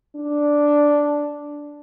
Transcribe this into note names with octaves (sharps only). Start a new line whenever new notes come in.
D4